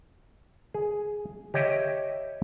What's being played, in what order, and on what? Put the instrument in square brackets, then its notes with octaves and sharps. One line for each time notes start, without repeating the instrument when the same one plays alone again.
[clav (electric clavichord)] G#4
G4 C#5 D#5 E5 G5